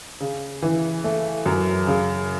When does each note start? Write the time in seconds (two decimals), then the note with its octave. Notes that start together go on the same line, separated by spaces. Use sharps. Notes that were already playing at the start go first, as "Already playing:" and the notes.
0.20 C#3
0.62 E3
1.04 A3
1.46 F#2
1.87 C#3